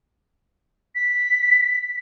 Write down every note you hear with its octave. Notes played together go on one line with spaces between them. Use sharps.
B6